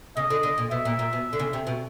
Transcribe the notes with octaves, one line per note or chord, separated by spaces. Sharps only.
C#3 D#5
D3
D3
A#2
B2 E5
A#2
A#2
B2
D3
C#3
C3
B2